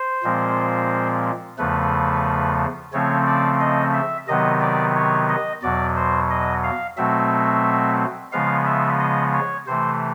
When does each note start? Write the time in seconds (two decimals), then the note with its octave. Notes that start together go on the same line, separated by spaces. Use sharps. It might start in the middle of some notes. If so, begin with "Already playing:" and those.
Already playing: C5
0.24 A#2 F3 G#3 C4
1.58 E2 C#3 F3 A3 B4
2.93 C#3 F3 A3 C4 C#5
3.26 D5
3.60 D#5
3.94 E5
4.28 C3 D#3 F#3 B3 D#5
4.61 D5
4.96 C#5
5.29 D#5
5.63 E2 B2 F#3 D5
5.97 C5
6.30 D#5
6.64 F5
6.97 B2 F#3 A3 C4 E5
8.32 C#3 F3 G#3 B3 F5
8.66 E5
9.00 D#5
9.34 C#5
9.67 C3 E3 A3 C5